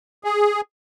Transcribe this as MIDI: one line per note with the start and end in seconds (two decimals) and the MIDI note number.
0.24 0.61 68